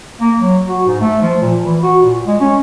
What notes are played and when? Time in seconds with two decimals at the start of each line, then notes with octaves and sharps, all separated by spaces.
0.21 A#3
0.39 F#3
0.68 F#4
0.86 G#2
1.01 A3
1.22 F3
1.41 A#2
1.64 E3
1.83 F#4
2.02 A#2
2.26 G#3
2.40 C#4